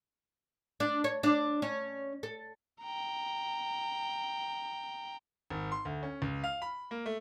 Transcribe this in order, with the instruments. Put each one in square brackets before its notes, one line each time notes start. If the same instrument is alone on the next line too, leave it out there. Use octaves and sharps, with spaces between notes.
[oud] D4
C#5
D4
C#4
A4
[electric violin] G5 A#5
[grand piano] G#1
C6
D2
C#4
C#2
F5
B5
A#3
A3